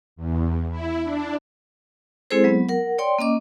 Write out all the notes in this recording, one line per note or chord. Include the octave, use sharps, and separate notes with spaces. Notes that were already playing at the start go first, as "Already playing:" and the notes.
E2
E4
D4
G#3 C4 E4 G#4 A4 C5
F#3 B3
A#4 F#5
C#5 D5 G5 C6
A#3 C#4 D#5 D6